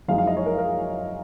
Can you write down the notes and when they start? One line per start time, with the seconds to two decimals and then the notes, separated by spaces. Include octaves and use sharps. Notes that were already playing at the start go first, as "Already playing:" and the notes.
0.08 F#1 F#2 F3 G#3 D#4 F5
0.18 F5
0.27 D#5
0.37 C#5
0.46 A#4
0.58 A#4
0.65 G#4